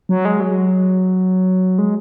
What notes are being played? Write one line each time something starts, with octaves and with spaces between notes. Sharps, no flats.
F#3
G#3
F#3
G#3